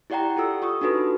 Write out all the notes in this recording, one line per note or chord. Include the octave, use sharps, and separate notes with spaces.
E4 G4 D5 F#5 G5 A#5
F4 G4 A4 E6
F4 C#6 D#6
D4 D#4 F#4 A4 B4